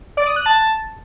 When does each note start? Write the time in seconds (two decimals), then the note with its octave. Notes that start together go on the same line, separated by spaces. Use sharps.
0.17 D5
0.27 D#6
0.36 F#6
0.46 A5